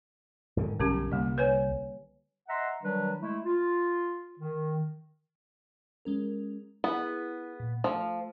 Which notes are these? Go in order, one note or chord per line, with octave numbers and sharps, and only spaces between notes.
G#2 D3 D#3
B1 G2 D3 C#4 G4
C2 G3 A#3
B4 C#5 G#5
D#5 E5 F#5 A#5 C6
D#3 F#3 G3 D4 B4
G#3 A3 E4
F4
D#3
G#3 C#4 A#4
B3 E4 G#4
A#2
F3 A3